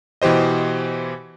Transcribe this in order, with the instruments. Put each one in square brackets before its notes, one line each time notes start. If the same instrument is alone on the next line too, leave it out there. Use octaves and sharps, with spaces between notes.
[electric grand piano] B2 E3 G4 C5 D#5